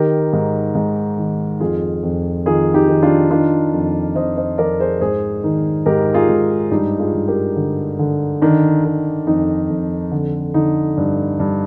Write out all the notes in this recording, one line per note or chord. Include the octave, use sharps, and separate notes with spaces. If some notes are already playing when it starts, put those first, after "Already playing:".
Already playing: D#3 G4 A#4
G#2
G#2
D#3
F2 F4 G#4
F2
D#3 F4 G#4
D#4 G4
D#3
D4 F4
D#3 D4 F4
F2
F2 C5 D#5
C5 D#5
F2 A#4 D5
G#4 C5
G#2 G#4 C5
D#3
G#2 G4 A#4
F4 G#4
G#2
G2 D#4 G4
F4 G#4
G2
G4 A#4
D3
D3
D#3 D4
D#3
F2 D#4
F2
D3
D3 D#4
G2
G2